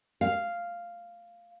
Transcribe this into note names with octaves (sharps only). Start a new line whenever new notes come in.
F5